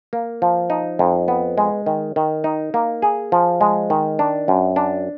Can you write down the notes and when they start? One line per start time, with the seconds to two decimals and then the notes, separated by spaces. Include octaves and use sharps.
0.13 A#3
0.42 F3
0.70 D#4
0.99 F2
1.28 B3
1.58 G#3
1.86 D#3
2.16 D#3
2.44 D#4
2.74 A#3
3.02 G#4
3.32 F3
3.61 G#3
3.90 D#3
4.19 D4
4.48 F#2
4.76 D4